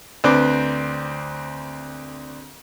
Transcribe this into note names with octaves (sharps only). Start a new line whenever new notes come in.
D2 C4 D4 B4 D6